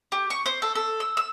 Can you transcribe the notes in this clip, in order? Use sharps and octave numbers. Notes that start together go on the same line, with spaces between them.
G4
C#6
C5
A4
A4
E6
E6